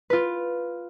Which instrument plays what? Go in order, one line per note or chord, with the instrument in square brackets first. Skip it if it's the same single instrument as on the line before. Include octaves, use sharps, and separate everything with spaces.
[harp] F4 B4